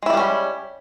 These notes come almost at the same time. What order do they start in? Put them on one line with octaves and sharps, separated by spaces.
G#3 E4 G3 B3 C#4